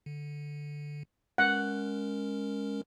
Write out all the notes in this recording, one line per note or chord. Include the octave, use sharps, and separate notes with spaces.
D3
G#3 C#4 A#4 F#5